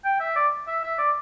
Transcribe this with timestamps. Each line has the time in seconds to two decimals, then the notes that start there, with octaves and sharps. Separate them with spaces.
0.05 G5
0.20 E5
0.36 D5
0.67 E5
0.83 E5
0.98 D5